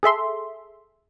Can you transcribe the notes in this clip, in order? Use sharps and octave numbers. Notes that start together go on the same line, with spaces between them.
G#4 A4 E5 C6